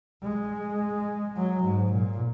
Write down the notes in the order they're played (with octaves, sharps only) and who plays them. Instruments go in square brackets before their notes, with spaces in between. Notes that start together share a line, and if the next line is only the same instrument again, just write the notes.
[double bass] G#3
F#3
G#2
A#2